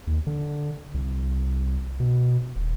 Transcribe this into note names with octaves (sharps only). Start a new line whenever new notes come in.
D#2
D3
C2
B2
D#1